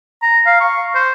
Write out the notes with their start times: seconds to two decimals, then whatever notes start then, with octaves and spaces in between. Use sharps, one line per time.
0.22 A#5
0.46 F5
0.61 C#6
0.95 C5